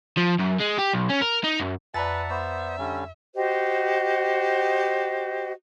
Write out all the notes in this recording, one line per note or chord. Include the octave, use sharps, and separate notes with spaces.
F3
F#2
G#3
G4
B1
C#4
A#4
D#4
F#2
F2 B4 D5 E5 F#5 A5 A#5 A6
B3 C5 E5 B5 C#6
D3 G3 C#4
F#4 G4 C5 D#5